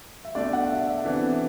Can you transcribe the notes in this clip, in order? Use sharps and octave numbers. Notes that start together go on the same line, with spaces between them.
E5
B2 A3 D4 D5
F#5
E5
E5
C3 E3 B3 D4 A4